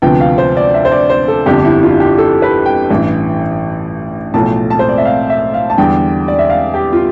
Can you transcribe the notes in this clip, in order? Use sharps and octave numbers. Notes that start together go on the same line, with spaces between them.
D2 C3 F3 B3 G5
F5
C5
D5
E5
C5
D5
C5
A4
G1 F2 D3 G4
E4
F4
G4
A4
B4
G5
A1 G2 E3
B1 A2 F3 A3 A5
A5
C5
D5
E5
F5
E5
F5
A5
E2 D3 G3 G5
D5
E5
F5
G4
F4